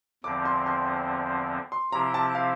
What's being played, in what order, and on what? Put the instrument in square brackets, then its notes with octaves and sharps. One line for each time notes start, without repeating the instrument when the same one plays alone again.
[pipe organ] E2 D3 F3 C4 [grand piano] D6
[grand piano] C6
C6
C6
[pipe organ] C3 F3 C4 E4 G4 [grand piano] A#5
[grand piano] A5
F5